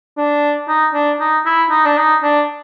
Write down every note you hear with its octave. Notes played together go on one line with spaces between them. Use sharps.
D4
D#4
D4
D#4
E4
D#4
D4
D#4
D4